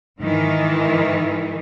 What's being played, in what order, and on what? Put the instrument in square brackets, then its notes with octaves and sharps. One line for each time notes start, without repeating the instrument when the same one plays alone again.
[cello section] G#2 D#3 E3